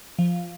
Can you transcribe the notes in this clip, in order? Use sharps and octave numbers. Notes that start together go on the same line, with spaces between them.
F3